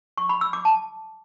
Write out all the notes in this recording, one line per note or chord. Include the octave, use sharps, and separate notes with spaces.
C#6
B5
E6
D6
A5